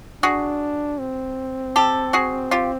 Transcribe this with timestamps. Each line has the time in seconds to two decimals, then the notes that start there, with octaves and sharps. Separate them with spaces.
0.23 D4 F#4 G#4
0.99 C4
1.76 G4 A4
2.13 F#4 G#4
2.51 F4 G4